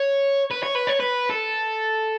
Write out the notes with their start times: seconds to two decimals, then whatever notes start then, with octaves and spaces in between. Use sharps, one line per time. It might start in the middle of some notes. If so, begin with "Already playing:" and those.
Already playing: C#5
0.51 B4
0.63 C#5
0.75 B4
0.88 C#5
1.00 B4
1.30 A4